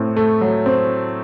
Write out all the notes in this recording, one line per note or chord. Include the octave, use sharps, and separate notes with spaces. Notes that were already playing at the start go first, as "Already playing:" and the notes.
Already playing: A2 C4
A3
F#3
C4